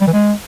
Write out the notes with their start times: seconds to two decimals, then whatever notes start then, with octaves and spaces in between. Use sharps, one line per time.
0.01 G3
0.07 E3
0.13 G#3